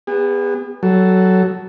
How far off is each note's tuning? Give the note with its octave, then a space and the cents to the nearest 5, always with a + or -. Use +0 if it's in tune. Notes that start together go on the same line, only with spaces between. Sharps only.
B3 +0 G#4 -40
F#3 +15 A4 +0